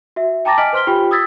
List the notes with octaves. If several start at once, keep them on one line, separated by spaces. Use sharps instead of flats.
F#4 E5
G5 A5 A#5 D6 A6 A#6
D#5 G#5 F6 B6 D7 F#7
B4 C5 C6 F6 B6 G7
F4 G4 G5 B5
D#6 E6 G#6 A6 B6